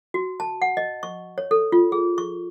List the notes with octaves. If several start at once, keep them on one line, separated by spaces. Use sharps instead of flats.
F#4
A5
F#5
D#5
C#6
C#5
A4
F4
G#4
C#6